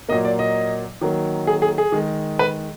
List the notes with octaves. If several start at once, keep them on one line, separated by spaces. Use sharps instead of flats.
A#2 F#3 A#3 D#5
D5
D#5
D#3 F#3 A#3
G#4
G#4
G#4
D#3 G#3
B4